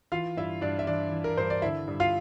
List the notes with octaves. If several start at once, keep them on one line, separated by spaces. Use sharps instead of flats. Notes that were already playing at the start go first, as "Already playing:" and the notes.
E3 F4 F5
G2 E4 E5
G2 D4 D5
E5
E3 D4 D5
E3
A#4
G2 C5
D5
D3 E4 E5
G2
F4 F5